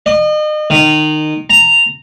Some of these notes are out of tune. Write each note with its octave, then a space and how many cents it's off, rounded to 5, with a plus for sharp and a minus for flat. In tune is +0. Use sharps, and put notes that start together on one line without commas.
D#5 -35
D#3 -20
A#5 -10